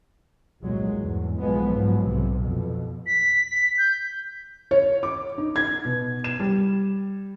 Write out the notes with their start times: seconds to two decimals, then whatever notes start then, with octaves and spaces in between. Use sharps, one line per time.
0.62 G1 C2 A#2 F#3 G#3
0.95 E2 G#2
1.38 B1 F3 G#3 B3
1.66 G#2 F3 F#3
2.04 B1 C3
2.38 F2 B2
3.06 B6
3.48 B6
3.78 G6
4.71 C#5
5.03 D6
5.38 D#4
5.56 G#6
5.85 B2
6.24 E7
6.40 G3